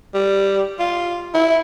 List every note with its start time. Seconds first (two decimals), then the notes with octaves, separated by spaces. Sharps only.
0.14 G3
0.79 F4
1.34 E4